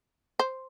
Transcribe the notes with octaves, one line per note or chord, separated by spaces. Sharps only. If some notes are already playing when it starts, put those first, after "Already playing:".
C5